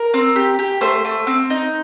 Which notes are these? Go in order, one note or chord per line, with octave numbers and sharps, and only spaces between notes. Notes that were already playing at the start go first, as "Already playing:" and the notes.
Already playing: A#4
C4
G4
G4
A3 C5
A3
C4
D#4